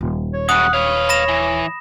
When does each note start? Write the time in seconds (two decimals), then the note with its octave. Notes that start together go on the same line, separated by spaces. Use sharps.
0.01 D#1
0.33 C#5
0.49 F#2 C#3 F#5 D#6
0.74 B4 C#5 F5
1.09 B5 A#6 E7
1.29 E3